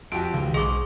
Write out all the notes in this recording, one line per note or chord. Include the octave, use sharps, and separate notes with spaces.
F2 F#4 G4 D7
C#2 D#3
B1 G#2 G#4 D#5 D6